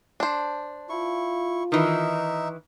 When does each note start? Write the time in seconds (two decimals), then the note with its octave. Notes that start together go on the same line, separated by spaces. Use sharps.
0.20 D4 C5
0.89 E4 F4 C#6
1.72 D#3 E3 D#4 E5